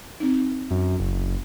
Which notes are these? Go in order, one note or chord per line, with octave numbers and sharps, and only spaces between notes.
C4 D#4
F#2
F#1